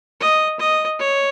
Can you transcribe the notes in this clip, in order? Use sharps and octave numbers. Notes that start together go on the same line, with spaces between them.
D#5
D#5
C#5